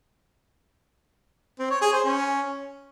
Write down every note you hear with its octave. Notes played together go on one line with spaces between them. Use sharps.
C4
C#5
G#4
C5
C#4